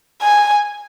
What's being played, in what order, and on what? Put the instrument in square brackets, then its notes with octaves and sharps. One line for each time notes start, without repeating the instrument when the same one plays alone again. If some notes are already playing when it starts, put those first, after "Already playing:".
[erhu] G#5